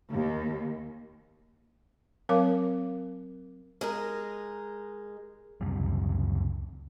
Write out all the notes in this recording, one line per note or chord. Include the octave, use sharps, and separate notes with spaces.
D#2
F#3 C4 A#4 C#5 F5 D6
G#3 D#4 A#4
C#2 F#2 C3 G3